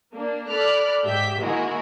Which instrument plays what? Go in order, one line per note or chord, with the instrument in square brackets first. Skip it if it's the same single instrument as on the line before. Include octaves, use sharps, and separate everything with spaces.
[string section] A#3 D4
A4 D5 B5 D6 F6 F#6
G#2 G4 E5 G6 B6
D#3 G#3 A#3 E4 F#4 A#4